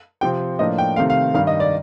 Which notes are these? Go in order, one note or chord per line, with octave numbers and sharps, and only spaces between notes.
C3 F3 C4 G5
A2 F3 A#3 D4 D#5
G5
C3 D#3 A3 C4 F5
F5
G2 D#3 G3 F5
D#5
D5